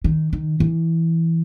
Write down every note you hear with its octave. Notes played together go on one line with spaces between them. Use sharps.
D#3
D#3
E3